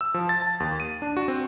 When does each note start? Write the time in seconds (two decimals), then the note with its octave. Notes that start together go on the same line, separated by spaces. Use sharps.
0.01 E6
0.14 F3
0.29 A6
0.42 A5
0.60 D#2
0.80 D#7
1.02 D4
1.17 F#4
1.28 C4